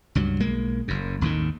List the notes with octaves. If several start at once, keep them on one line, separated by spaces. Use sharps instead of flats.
C#2 G2 F#3
B1 G#3 A#3
F#1 F#2
G#1 D#2 A2 D#3